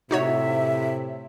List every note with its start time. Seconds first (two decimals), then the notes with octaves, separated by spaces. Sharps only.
0.11 A2 C3 D#4 F#4 C#5 E5